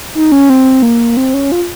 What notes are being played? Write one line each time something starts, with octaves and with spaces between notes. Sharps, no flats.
D#4
C#4
C4
A#3
C4
C#4
F4